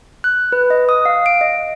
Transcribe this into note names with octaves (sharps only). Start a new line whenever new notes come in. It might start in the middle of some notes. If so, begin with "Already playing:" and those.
F#6
B4
D#5
D#6
F5
D7
D#5